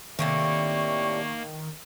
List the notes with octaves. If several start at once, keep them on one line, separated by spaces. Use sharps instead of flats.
A2 C3 D#3 A#3 D4 E5 G5 C#6